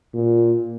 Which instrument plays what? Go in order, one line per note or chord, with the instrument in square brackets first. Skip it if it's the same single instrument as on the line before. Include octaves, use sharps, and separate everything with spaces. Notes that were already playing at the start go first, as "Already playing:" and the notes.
[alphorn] A#2